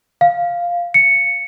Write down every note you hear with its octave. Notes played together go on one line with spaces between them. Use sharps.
F5
C#7